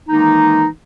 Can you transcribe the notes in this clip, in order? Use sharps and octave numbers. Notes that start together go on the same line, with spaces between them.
D#3 E3 G#3 A#3 D#4